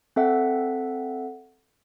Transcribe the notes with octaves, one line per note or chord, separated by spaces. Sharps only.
C4 A4 E5 F#5